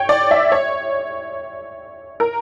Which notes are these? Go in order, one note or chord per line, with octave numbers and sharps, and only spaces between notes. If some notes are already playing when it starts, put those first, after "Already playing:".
Already playing: C#5 G5
D5
E5
C#5
A#4